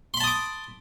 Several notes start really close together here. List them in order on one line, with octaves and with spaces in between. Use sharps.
C6 B5 A5 D#6 D6